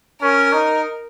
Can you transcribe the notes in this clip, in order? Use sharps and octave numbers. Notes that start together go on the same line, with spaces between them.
C#4 A#4
D#4